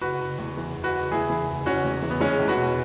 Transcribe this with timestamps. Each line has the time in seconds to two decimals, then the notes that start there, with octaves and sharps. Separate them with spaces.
0.01 F#1 F#4 B4
0.20 F#1
0.38 E2
0.57 E3
0.75 F#1
0.84 F#4 B4
0.93 F#1
1.12 E2 E4 G#4
1.30 E3
1.48 F#1
1.66 F#1 C#4 F#4
1.85 E2
2.03 E3
2.10 B3
2.20 E2 G#3 C#4
2.40 E2
2.47 F#4 B4
2.58 B2